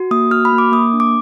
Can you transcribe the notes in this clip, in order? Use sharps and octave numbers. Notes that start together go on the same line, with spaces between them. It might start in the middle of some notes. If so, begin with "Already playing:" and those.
Already playing: F#4
A#3 D#6
F#4 F6
B5
A#3
D6
A#3 D#6
D4
D6